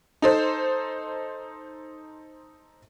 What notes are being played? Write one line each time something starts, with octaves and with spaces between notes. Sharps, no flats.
D#4 A4 C5